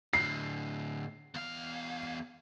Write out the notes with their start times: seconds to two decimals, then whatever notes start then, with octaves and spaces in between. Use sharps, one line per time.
0.13 A2 D3 C7
1.35 E2 F5